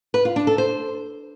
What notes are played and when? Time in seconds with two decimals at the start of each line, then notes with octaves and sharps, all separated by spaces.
0.14 B4
0.25 F4
0.36 D4
0.47 A4
0.58 C5